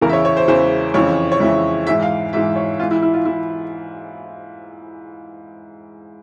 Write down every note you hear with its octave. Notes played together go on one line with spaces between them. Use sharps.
E2 C#3 E3 A#4
E5
C#5
C#5
C5
E2 C#3 E3 C5
F2 C#3 E3 C#5
C#5
F2 C#3 E3 E5
G#2 E3 E5
F5
G#2 E3 E5
C#5
G#2 E3 F4
E4
E4
F4
E3 E4